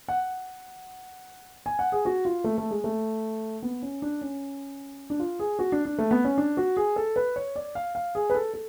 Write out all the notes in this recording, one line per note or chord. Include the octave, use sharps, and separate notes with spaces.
F#5
G#5
F#5
G#4
F#4
F4
A3
A3
G#3
A3
B3
C#4
D4
C#4
D4
F4
G#4
F#4
D4
D4
A3
B3
C#4
D4
F#4
G#4
A4
B4
C#5
D5
F5
F5
G#4
B4
A4
A4